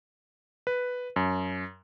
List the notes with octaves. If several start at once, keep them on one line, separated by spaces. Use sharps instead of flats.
B4
F#2